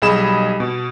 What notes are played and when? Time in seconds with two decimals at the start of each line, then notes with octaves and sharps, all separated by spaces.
0.02 B1 G3 G#4 D#5 B5 E7
0.60 B2